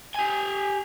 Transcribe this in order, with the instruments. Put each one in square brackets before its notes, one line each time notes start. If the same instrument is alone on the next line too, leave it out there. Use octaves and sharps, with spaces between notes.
[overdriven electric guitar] G4 G#5